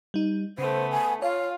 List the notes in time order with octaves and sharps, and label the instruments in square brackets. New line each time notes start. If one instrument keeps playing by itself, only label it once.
[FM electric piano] G3 D#4
[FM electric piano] C#3 [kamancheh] A3 B3 [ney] C5
[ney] G#5
[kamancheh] F4 [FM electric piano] C#5 [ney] F5